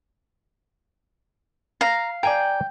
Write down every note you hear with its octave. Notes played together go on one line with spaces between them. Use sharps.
F5 A#5
D5 G5 G#5 A#5